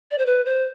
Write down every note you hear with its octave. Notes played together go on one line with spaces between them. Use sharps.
D5
C5
B4
C5